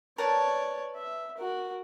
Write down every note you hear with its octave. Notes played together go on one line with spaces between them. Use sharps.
A#4 B4 C#5 D5 A5
E5
F#4 A#4